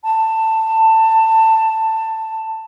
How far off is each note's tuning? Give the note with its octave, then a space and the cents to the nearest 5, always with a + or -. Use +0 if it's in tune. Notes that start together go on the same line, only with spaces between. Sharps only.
A5 +15